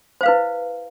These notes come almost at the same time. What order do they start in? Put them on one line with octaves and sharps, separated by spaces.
C5 F5 B4 E4